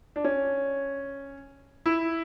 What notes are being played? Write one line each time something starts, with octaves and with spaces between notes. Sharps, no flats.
D4
C#4
E4